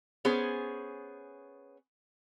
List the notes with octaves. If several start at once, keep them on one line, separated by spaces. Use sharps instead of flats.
B3 C#4 G#4 C5